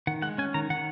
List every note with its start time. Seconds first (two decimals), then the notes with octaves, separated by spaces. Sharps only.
0.07 D#3 F#5
0.22 G#3 F#5
0.38 C#4 G#5
0.54 D#3 A#5
0.70 D#3 F#5